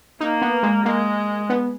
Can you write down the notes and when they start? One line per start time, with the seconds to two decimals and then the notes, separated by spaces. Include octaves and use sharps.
0.20 A#3 D#4
0.42 B3
0.63 G#3
0.85 G#3 A#3
1.50 B3